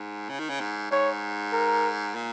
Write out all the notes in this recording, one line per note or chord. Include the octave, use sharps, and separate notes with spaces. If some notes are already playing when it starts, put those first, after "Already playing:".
Already playing: G#2
C#3
D#3
C#3
G#2
G#2 C#5
A#4
A#2